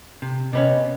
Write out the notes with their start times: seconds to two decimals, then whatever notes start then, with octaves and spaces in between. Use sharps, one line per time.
0.22 C3
0.53 C3 B3 C#4 D#5